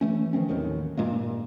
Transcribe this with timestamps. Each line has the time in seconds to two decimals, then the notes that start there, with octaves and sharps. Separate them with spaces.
0.01 E3 A3 C#4
0.33 D#3 F3 C4 C#4
0.48 A1 D#2 D#3 F#3
0.97 G2 A#2 G#3 A#3